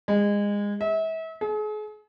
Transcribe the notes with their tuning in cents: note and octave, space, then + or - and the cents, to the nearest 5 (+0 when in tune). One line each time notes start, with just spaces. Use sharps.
G#3 -25
E5 -35
G#4 +40